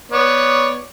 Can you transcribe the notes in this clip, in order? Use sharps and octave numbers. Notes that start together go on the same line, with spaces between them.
B3 C#5 D5